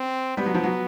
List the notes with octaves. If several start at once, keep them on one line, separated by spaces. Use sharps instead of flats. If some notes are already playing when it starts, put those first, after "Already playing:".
Already playing: C4
G3 B3
F#3
F3
F#3